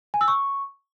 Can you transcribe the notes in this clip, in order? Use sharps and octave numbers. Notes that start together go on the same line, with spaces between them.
G#5
E6
C#6